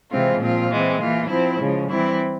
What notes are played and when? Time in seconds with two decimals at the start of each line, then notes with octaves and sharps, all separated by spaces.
0.11 C3 E3 G#3 C4 F4
0.40 A#2 F3 C4 F4
0.69 E3 G#3 C4
1.00 E3 A#3 F4
1.29 F3 C4 E4
1.59 C#3 F3 G#3
1.89 E3 G3 C4 E4